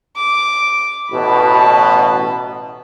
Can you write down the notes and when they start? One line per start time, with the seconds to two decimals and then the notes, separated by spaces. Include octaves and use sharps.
0.16 D6
1.11 A1 B2 A5 B5